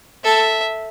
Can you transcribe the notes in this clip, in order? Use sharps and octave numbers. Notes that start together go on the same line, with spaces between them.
A4 E5